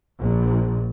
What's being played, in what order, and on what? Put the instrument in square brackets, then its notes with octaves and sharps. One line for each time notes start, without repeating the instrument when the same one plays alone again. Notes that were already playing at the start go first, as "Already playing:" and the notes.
[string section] A#1